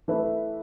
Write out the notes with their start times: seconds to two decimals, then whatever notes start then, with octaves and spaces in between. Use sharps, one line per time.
0.08 E3 A3 E4 B4 E5